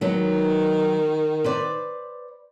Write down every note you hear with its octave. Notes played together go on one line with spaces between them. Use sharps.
D#3 F#3 G#3 B3
B4 C5 D5